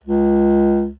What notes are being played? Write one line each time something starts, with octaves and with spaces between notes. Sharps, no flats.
C#2